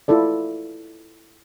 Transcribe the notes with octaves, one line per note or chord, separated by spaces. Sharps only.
E4 F4 A4 D5